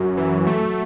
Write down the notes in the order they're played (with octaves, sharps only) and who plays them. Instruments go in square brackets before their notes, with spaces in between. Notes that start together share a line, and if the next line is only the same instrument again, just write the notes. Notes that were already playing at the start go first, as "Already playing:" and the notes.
Already playing: [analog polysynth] F#2 [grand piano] F#3 F#4
[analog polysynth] E3
A3